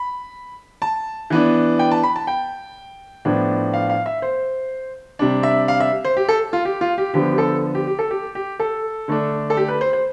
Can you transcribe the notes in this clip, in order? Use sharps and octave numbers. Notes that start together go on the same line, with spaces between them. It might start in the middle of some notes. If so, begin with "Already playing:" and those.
Already playing: B5
A5
E3 B3 D4
G5
A5
B5
A5
G5
A2 F3 B3 D4
F5
F5
E5
C5
C3 G3 D4
E5
F5
E5
C5
G4
A4
F4
G4
F4
G4
D3 F3 B3 G4
G4
A4
G4
G4
A4
G4
G4
A4
D3 A3 D4
A4
G4
B4
C5
C5